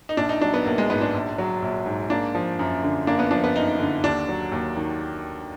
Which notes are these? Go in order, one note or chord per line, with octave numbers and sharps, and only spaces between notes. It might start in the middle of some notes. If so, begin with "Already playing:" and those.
D#4
A#1 D4
D#4
F#3 D4
B3
A#1 A#3
G#3
G#2 B3
D4
A#1
F#3
A#1
G#2
A#3 D4
F3
F#2
D3
A#3 D4
B3
F3 D4
B3
F#2 D#4
D3
D#2 D4
F#3
D#2
D#3